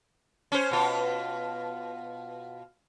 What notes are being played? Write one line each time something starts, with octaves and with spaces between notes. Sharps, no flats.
C#4 C5
B2 F4